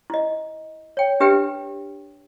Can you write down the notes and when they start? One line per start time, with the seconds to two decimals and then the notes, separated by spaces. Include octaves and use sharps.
0.10 E4 D#5
0.97 C#5 G5
1.20 D4 G4 B4 E5 G5